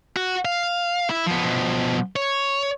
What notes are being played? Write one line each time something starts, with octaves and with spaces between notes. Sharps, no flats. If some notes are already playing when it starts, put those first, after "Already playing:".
F#4
F5
E4
F3 B3
B2 F3
C#5